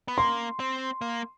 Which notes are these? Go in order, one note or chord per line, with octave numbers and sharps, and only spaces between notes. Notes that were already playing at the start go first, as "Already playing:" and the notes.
B3
A#3 C6
C4
A#3